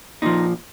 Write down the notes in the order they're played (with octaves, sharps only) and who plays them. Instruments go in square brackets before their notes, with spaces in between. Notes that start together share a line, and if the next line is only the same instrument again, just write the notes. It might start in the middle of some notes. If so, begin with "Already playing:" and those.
[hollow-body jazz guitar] A#2 F3 D#4